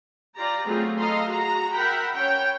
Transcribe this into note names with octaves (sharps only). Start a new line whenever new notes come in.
F4 G4 D5 A#5
F#3 A3 B3 C4 F4 G#4
A4 D#5 F5 A#5 C6
F#4 G#4 A#5
A#4 E5 F#5 G5 B5
C#4 C#5 G5